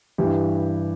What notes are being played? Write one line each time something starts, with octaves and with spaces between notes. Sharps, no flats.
G2 E3 G4